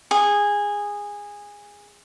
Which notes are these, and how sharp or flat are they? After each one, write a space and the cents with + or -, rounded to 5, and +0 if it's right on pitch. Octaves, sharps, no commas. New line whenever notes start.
G#4 -15